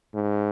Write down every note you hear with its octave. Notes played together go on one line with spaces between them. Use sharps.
G#2